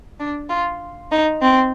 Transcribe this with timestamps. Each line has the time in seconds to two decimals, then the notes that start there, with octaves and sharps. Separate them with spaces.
0.20 D4
0.50 F4
1.12 D#4
1.42 C4